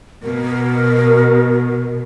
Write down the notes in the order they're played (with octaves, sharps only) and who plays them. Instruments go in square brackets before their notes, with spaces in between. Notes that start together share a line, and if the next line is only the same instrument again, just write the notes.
[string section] B2 [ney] A#4